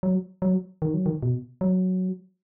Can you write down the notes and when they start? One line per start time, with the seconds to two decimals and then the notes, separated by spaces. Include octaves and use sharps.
0.03 F#3
0.42 F#3
0.82 D#3
0.94 F#3
1.06 D#3
1.23 B2
1.61 F#3